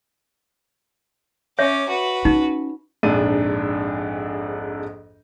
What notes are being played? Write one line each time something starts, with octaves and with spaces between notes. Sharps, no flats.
C#4 C#5 E5 D6
F#4 B4
C#4 D#4
A#1 F2 G#2 D4 D#7